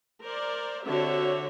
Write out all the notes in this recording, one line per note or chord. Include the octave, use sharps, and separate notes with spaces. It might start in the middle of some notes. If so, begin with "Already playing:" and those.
A#4 C5 D5
D3 C4 F#4 G4 C#5 E5